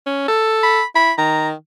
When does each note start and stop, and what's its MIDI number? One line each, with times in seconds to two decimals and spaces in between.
0.06 0.28 61
0.28 0.81 69
0.63 0.85 83
0.95 1.12 64
0.95 1.12 83
1.18 1.53 51
1.18 1.48 82